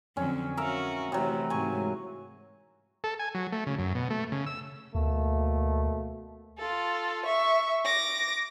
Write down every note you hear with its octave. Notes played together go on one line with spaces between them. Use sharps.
F2 D3 F#3 C#4
C#4 F#4 A#4 E5 F5
C3 E3 F#3 A3
G#2 C3 G#3 G#5 C#6
A4
G#5
F#3
A3
C#3
F#2
B2
A3
C#3
E6
D2 B2 A3 A#3
F4 A4
E5 C#6
D6 A#6